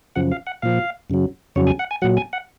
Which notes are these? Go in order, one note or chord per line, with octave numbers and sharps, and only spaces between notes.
F#2 C#3 F3 F#5
F5
F#5
A#2 F3 F5
F#2 C#3 F#3
F2 C#3 F#3 C#5
G#5
F#5
G#5
A#2 F#3 F#5
G#5
F#5